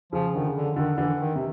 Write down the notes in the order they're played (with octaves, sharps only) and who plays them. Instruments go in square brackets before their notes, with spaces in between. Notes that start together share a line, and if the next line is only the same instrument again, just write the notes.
[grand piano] C#3 [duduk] F3
[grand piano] D3 [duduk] D#3
[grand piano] C#3
[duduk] D3
[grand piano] D3 [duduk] D#3
[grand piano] D3 [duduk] E3
[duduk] D#3
[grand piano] C3